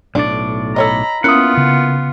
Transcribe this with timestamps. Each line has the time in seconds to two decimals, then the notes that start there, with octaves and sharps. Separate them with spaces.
0.15 B1 A2 D4 D5
0.76 A4 C#5 D#5 A#5 B5
1.24 A#3 B3 C#4 E4 F4 F#5 D#6
1.57 C#3